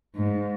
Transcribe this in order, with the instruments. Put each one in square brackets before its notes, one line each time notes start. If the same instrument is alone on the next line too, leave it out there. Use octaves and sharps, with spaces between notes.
[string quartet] G#2